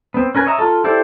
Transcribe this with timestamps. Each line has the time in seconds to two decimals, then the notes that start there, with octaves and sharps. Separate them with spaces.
0.14 B3 C4
0.35 C#4 A#4 B4 G#5
0.46 C#5 D#5 E5 A#5
0.59 F4 A4
0.84 E4 G4 A4 C5 D5